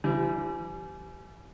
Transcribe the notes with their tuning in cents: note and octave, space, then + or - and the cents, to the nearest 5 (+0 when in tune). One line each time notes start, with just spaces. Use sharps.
E3 +40 G3 -15